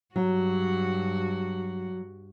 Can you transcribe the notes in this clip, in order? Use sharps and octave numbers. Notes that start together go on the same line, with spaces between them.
G2 F#3 F#4